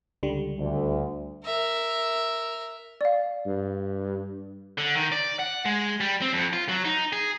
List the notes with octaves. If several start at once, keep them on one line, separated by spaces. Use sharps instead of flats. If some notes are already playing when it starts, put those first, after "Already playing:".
C#2 D3 G3
D2
A#4 E5
D5 F5
G2
D3
D#3
D5
F#5
G#3
G3
C4
F2
F4
F#3
D#4
G#4